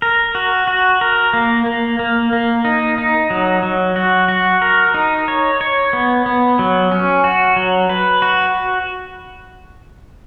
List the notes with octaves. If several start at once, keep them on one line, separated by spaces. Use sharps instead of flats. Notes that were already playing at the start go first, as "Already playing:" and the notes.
A#4
F#4
F#4
A#4
A#3
A#3
A#3
A#3
D#4
D#4
F#3
F#3
F#4
F#4
A#4
D#4
C#5
C#5
B3
B3
F#3
C#4
F#4
F#3
B4
F#4